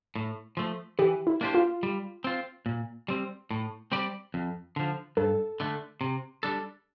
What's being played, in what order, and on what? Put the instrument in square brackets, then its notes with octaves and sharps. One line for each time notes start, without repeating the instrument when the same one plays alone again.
[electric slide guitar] A2
F3 A3
[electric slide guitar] E3 [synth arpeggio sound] G4
[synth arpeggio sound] E4
[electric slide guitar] A#3 D4 G4 C5
[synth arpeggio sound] F4
[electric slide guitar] G3
C4 F4
A#2
G3 C4
A2
G3 C4 G4 D5
F2
D3 F3
[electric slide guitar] G2 [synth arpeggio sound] A4
[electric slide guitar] D3 A3
C3
G3 D4 A4